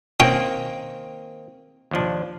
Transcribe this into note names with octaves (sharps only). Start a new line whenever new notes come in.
D#3 A#3 C4 C#4 G5
D#2 F3 D4